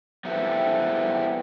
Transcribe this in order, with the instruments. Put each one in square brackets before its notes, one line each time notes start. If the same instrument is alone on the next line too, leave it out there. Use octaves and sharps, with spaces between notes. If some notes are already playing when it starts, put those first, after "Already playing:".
[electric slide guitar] B3 C4 E4 G4 A4